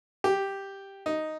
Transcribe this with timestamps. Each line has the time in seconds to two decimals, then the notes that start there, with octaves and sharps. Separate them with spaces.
0.24 G4
1.06 D#4